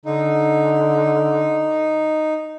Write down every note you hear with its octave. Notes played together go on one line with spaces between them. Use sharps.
D3 D#4